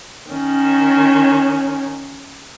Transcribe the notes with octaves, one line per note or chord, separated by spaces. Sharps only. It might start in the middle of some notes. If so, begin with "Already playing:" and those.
D#3 C#4